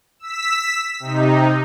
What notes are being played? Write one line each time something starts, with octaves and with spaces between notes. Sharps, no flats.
E6 B6
C3 D#4